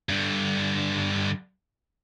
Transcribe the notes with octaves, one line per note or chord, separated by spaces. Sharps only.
G2 D3